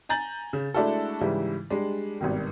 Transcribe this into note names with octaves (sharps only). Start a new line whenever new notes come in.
G#5 A#5 G6 A6 F#7
C#3
G#3 A3 D4 E4 F#4 A4
G#2 C#3 E3 G3 E4
G3 G#3 D4
G#1 G2 B2 D#3